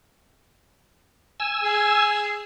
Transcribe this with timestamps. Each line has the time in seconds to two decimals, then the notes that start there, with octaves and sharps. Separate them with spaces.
1.40 G#5 E6
1.64 G#4